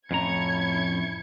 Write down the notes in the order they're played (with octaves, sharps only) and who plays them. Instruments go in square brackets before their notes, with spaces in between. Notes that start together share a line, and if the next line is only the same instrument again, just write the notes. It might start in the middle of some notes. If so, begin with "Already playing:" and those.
[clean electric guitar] F2 A2 A#5 [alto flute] C#4 [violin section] E4 G#6 C#7